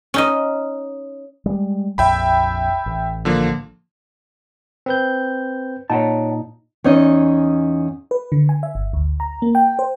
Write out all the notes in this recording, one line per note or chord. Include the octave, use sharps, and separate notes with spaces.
C#4 D#4 D#5
G3 G#3
A#1 F2 E5 G5 B5
A1
D3 F3 A#3
C4 B4 G6
A#2 D#4 C#5 F#5 A5
E2 C#4 D#4 D#5
B4
D3
G#5
E5
G1
D2
A#5
A#3
G5
C5